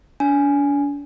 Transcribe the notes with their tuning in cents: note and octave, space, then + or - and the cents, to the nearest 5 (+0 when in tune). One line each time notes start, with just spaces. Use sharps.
D4 -40 G#5 +0